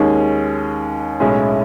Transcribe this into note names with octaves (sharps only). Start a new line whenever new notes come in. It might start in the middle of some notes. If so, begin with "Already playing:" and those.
Already playing: D#2 D#3 G#3 C#4
B1 A2 G#3 C#4 E4